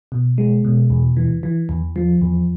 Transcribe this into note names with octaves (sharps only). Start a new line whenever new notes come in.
B2
G#3
B2
E2
E3
E3
E2
F3
E2